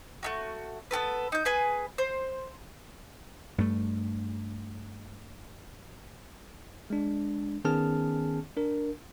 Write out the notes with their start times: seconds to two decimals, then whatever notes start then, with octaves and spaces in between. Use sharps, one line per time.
0.23 A3 E4 F#4
0.91 B3 F#4 A4 B4
1.32 D#4 G6
1.45 G#4 B4 G#5
1.98 C5
3.58 G2 A3
6.90 G#3 D4
7.65 D#3 B3 C#4 G#4 A5 F6
8.57 D4 A#4